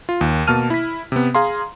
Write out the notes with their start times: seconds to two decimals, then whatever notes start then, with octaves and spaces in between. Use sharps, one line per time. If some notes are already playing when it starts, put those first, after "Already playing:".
0.09 F4
0.21 D#2
0.47 B2 A#3 A5 F6 D#7
0.70 E4 B6
1.12 C3 B3
1.35 G#4 F5 A#5 C6